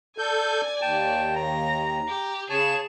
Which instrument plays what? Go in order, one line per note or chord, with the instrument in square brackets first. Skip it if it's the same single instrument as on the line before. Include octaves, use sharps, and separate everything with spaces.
[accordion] A4 G6 [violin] D5 G#5
[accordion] D#2 [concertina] G5 A5
[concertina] A#5 [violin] A#6
[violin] G4
[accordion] C#3 [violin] G#4 E7 [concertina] C#5 A5